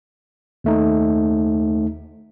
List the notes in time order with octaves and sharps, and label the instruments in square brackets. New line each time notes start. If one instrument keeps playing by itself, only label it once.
[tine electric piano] D#2 A3 D#4